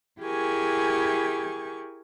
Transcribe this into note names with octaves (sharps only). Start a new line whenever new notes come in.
E4 G4 G#4 A#4 G#5 C#6